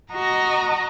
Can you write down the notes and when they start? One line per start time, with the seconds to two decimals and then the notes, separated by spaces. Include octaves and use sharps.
0.13 F#4 D#5 A#5